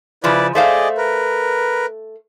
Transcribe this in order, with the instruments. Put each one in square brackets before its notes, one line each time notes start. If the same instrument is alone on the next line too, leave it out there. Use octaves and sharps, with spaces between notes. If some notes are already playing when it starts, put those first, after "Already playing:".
[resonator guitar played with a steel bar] C#3 F3 [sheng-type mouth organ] E4 B4 D5
[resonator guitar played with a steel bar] A3 C5 F5 [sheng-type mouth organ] G#4 D5 D#5
[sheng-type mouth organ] A#4 B4